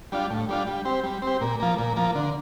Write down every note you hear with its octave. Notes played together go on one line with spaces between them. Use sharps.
G3 D4 F4
A2
G3 D4 F4
G3
C4 G4
G3
C4
G4
A#2
F3 A#3
A#2
F3 A#3
D3